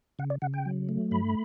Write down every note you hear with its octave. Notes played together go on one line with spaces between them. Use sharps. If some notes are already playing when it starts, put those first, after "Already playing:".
C#3 F#5
D5
C#3 F#5
G5
F#3
A3
G2 B5